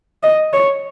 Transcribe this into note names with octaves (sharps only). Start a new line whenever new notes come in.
D#5
C#5